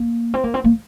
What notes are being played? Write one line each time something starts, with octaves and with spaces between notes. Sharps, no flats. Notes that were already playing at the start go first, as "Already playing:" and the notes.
Already playing: A#3
C4
A#3
C4
A#3